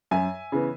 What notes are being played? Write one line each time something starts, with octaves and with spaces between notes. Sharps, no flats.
F#2 E5 G#5
C#3 E3 B3